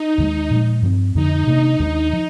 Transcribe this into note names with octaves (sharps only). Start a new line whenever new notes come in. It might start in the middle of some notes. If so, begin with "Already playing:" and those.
Already playing: D#4
D#2 D#3 G#3
A#2 F3 G#3
G2 F3 C4
F2 D3 F3 D#4
C3 D#3 A#3 D4
D#2 D#3 G#3 D4
F3